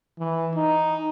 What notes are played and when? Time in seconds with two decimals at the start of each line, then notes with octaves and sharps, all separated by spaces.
0.19 E3
0.55 D#4